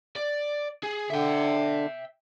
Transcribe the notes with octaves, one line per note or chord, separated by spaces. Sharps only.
D5
G#4
D3 E5 G5